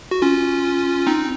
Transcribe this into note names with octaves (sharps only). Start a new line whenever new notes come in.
F#4
C#4 F4
C4 D#4